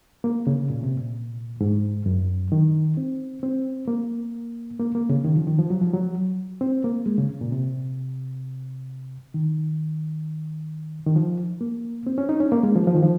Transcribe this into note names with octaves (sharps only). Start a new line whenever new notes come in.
A#3
C#3
A#2
C3
A#2
G#2
F#2
D#3
C4
C4
A#3
A#3
A#3
C#3
D#3
F3
D#3
F3
F#3
F3
F#3
C4
A#3
G#3
C#3
A#2
C3
D#3
D#3
F3
A#3
C4
C#4
D#4
C#4
A#3
G#3
F3
F3
D#3
F3